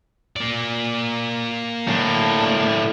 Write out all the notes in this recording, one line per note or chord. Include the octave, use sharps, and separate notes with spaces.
A#3 D5
A2 D4